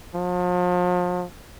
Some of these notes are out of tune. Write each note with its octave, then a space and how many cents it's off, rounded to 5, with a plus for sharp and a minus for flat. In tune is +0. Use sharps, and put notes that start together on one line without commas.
F3 +40